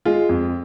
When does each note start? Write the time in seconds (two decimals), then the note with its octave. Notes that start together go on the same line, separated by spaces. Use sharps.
0.05 G#3 F4
0.29 F2